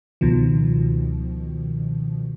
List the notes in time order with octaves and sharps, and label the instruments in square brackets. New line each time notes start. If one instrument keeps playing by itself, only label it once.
[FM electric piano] C#2 B2 D#3 F3